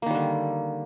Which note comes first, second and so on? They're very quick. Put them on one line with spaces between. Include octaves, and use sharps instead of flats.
A#3 D#3 G3 D3